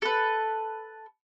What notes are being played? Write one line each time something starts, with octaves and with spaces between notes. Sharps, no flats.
A4 B4